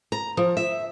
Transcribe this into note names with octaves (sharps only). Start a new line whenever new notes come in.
A#5
F3
E5